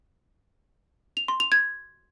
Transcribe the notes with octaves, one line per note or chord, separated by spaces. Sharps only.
F7
C6
F7
G#6